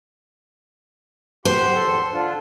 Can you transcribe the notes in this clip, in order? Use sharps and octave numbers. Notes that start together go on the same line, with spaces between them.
G4 C5 F#5 C6
E2 A4
D3 D4 F4